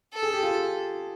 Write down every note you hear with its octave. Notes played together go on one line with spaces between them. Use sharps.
A4
G#4
G4
F4